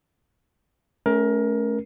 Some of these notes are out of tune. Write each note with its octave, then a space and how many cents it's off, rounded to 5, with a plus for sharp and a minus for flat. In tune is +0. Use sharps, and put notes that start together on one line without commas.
A3 -25 C#4 +0 A#4 +20